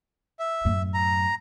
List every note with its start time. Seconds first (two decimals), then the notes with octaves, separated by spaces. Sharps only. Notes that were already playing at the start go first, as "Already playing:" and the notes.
0.39 E5
0.65 F#2 A2
0.94 A#5